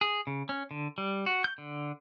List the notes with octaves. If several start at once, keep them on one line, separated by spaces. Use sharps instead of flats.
G#4
C#3
C#4
D3
G3
F#4
G6
D3